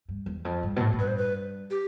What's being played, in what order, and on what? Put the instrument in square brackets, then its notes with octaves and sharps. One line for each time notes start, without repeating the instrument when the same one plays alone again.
[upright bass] G2
E2
F2
G2
B2
A2
A2
[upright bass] G2 [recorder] B4
[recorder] C5
B4
G4